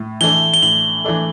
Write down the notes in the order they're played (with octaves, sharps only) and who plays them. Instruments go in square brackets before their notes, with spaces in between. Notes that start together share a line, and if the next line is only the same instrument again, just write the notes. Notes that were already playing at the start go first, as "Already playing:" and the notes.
Already playing: [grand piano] A2
[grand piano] E3 A3 D4 A4 [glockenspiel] G7
[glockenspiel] G7
[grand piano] A2 [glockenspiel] F#7
[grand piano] E3 A3 D4 A4